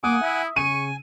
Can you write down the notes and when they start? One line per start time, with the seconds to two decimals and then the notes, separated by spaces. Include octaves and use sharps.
0.04 A#3 F#5 G#5 D6 D#6
0.21 E4 E5
0.56 C#3 G#5 C#6 D#7